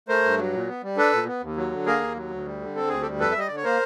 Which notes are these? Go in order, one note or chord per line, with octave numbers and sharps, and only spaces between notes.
A3 A#4 C5
G2
F#3
A#2
B3
G3
D4 A4 B4
A#2
B3
D#2
F#3
D3
A#3 G#4 A#4
D#2
F#3
D2
G3
D3
C4 A4
D2 G#4
G4 A4
G3
F2 A4 B4
E5
G3 D#5
D3 D5
C#5
A#3 A#4 C5